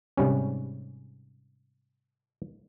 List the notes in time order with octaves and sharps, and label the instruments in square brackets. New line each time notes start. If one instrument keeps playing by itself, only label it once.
[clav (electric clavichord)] G#2 C3 G3 C#4